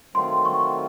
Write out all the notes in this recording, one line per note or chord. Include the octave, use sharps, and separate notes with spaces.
D#3 F#3 A3 C4 F4 C6
C#6